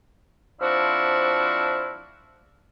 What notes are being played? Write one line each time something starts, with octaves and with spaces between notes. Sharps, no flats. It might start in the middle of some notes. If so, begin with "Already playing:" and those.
F3 C4 D4 E4 F#4 F5